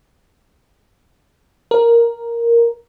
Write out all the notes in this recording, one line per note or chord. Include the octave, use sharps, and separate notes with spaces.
A#4